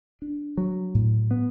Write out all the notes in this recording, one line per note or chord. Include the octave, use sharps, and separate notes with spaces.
D4
F#3
A2
B3